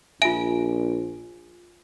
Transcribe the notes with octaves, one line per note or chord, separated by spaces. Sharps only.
A#1 F4 E5 G#5 D7